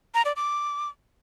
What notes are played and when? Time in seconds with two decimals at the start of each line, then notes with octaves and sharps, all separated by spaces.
0.14 A#5
0.25 D5
0.36 D6